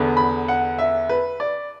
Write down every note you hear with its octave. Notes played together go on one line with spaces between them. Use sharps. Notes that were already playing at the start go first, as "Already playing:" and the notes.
Already playing: E2 D3 B3
B5
F#5
E5
B4
D5